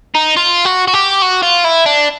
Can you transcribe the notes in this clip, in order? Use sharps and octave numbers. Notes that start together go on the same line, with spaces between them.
D#4
F4
F#4
F#4
G4
F#4
F4
E4
D4